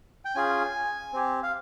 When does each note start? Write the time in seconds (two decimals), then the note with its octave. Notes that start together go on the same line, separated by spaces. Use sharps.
0.25 G5
0.35 C#4 F4 G#4 G#5
1.13 C4 G4
1.43 F5